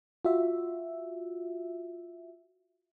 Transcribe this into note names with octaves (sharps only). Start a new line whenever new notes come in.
F4 F#4 E5